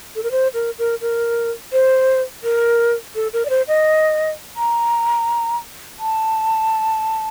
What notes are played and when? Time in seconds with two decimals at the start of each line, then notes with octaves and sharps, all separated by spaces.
0.15 A4
0.23 A#4
0.31 C5
0.54 A#4
0.79 A#4
1.01 A#4
1.72 C5
2.44 A#4
3.15 A4
3.33 A#4
3.45 D5
3.50 C5
3.68 D#5
4.57 A#5
5.99 A5